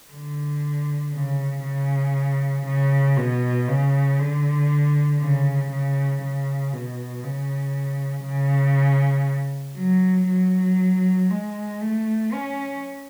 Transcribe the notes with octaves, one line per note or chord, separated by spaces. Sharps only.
D3
C#3
C#3
C#3
B2
C#3
D3
C#3
C#3
C#3
B2
C#3
C#3
F#3
F#3
G#3
A3
C#4